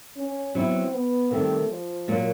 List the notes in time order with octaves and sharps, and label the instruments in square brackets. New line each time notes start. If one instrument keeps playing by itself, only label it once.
[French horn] C#4
[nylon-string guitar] F#3 B3 E4 [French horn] C4
[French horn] B3
[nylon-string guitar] C3 D#3 G3 C4 [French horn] A3
[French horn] F3
[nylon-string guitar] A#2 F#3 A#3